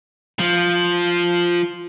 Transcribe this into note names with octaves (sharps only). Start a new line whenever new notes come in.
F3